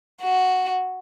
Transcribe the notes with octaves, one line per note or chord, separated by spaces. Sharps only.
F#4